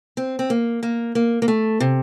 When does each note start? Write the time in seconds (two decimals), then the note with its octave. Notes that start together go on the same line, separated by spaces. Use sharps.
0.17 C4
0.39 C4
0.50 A#3
0.83 A#3
1.15 A#3
1.42 A#3
1.48 A3
1.80 C3